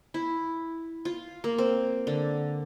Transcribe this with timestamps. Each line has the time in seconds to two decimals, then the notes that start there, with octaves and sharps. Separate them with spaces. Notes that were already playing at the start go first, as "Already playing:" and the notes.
0.14 E4
1.05 F4
1.44 A#3
1.58 C4
2.07 D3